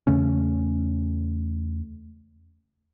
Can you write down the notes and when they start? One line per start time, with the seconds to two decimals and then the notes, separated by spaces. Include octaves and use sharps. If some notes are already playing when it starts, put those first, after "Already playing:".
0.07 E2 C#3 A3 C#4